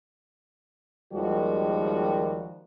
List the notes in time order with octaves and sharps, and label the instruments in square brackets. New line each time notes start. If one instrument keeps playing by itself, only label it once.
[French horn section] D#2 D#3 F3 G3 G#3 F#4